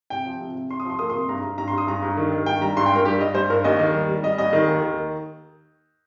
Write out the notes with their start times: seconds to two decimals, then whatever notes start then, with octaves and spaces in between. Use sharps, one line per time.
0.10 C3 G5
0.26 F3
0.41 C3
0.55 C3
0.70 C3 C6
0.80 D#6
0.85 F3 C6
0.99 A#3 D#6
1.10 C6
1.14 C3
1.29 G2 A#5
1.43 G2
1.58 G2 A#5
1.68 C6
1.73 G2 D#6
1.87 G2 A#5
2.03 G2
2.17 D#3
2.32 D#3
2.46 G2 G5
2.61 G3 A#5
2.77 G2 C6
2.86 G5
2.91 G2 A#4
3.05 G3 G4
3.20 G2 D#5
3.35 G3 C5
3.50 G2 A#4
3.64 D#2 D#5
3.79 D#3
3.94 G3
4.08 G3
4.23 G3 D#5
4.38 D#2 D#5
4.53 D#3
4.67 D#2
4.82 D#3